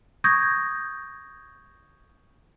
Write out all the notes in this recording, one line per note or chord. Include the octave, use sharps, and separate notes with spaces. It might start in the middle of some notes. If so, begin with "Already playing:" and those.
C#6 D#6 G6 G#6 A#6